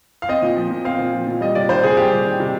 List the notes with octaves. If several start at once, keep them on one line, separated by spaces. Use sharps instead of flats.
F5
C4 D#5
A#2
F3
A#2
C4 F5
A#2
F3
A#2
G3 D#5
C3 D5
D#3 C5
C3 G#4
G3 G4
C3
D#3
C3